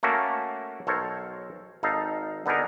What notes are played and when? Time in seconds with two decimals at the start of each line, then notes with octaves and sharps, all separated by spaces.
0.03 A3 A#3 C#4 F#4 A4 A#4
0.87 B1 A4 A#4 C5 C#5
1.83 G#1 D#4 A4 F5
2.46 D3 B3 D#4 G#4 A#4